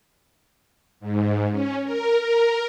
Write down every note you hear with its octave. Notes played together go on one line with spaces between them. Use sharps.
G#2
C#4
A#4
A#4